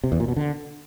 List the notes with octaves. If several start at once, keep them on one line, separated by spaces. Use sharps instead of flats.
C3
E2
A#2
B2
D3